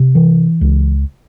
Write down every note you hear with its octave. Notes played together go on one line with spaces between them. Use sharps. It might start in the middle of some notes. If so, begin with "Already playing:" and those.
Already playing: C3
E3
C#2